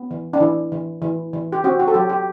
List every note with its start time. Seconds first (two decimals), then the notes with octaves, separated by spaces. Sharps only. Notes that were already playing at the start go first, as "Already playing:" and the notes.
Already playing: B3
0.11 E3
0.33 D4
0.40 E3 E4
0.72 E3
1.02 E3
1.33 E3
1.52 G4
1.64 C4 F#4
1.80 F#4
1.88 A4
1.94 F#3 G4
2.09 G4